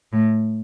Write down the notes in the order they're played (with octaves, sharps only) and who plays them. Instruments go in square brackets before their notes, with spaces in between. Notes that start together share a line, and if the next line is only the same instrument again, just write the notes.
[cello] A2